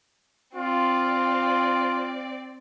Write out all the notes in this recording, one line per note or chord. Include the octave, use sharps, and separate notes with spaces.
C4 F4 D5